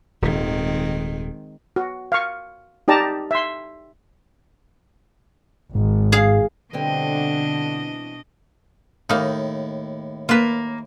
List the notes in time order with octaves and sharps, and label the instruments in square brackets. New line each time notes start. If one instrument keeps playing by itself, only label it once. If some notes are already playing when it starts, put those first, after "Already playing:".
[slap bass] D#1 G#2 [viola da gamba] D#3 G#3 C4
[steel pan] F#4
F5 C#6
D#4 G4 D5 A5 A#5
E5 C6
[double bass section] G#1 [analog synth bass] G#2
[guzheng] G#4 F5
[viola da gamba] B2 D4 D#5 [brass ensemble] D3 [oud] E3 G3 C4
[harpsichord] D#2 A2 [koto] A#3 D#4
[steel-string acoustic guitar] A#3 [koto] F4 B4